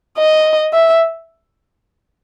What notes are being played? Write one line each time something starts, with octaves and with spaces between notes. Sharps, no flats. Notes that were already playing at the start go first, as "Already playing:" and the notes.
D#5
E5